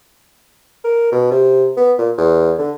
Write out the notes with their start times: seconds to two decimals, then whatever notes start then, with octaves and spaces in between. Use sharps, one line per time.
0.85 A#4
1.12 B2
1.31 C3
1.77 B3
1.98 A#2
2.18 E2
2.59 D3